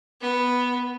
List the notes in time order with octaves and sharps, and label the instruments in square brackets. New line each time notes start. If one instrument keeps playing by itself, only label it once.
[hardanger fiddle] B3